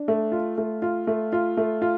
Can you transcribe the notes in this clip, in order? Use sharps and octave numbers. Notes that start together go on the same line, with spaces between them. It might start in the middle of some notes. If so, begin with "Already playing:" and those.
Already playing: D4
A3
F4
A3
F4
A3
F4
A3
F4